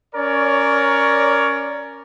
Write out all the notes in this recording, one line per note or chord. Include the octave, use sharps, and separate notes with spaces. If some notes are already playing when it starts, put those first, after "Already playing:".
C#4 A#4 C#5 D5